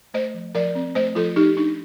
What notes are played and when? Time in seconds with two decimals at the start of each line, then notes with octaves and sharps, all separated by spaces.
0.14 A3 C5 D#5
0.34 F3
0.55 F3 A#4 D5
0.75 C4
0.95 A3 C5 D#5
1.15 F3 F4 A4
1.36 F3 D#4 G4
1.56 D4 D#4